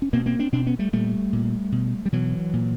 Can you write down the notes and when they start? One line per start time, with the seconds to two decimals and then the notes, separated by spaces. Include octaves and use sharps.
0.02 C#4
0.13 B2 A#3 C4
0.26 A#3 C4
0.39 C4 D4
0.52 B2 C4 D4
0.66 B3 C#4
0.79 G3 A3
0.93 A#2 G3 A3
1.33 A#2
1.72 B2
2.06 G3
2.12 B2 E3 F#3
2.53 A#2